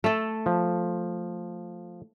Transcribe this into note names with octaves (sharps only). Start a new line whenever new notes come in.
A3 A4
F3